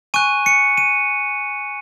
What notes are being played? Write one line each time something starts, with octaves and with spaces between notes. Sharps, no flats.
G#5 C#6 F#6 D#7
C#7
D#7